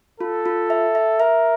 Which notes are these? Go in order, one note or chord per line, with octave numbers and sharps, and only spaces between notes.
F4 A4
F4
E5
E5
A#4 E5